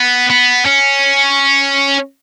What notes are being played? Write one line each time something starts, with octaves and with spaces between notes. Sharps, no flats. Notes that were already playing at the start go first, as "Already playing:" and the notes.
Already playing: B3
B3
C#4